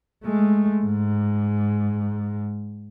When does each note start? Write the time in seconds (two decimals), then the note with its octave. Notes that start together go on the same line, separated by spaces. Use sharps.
0.24 G#3 A3
0.84 G#2